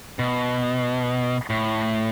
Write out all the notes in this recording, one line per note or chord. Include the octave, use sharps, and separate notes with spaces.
B2
A2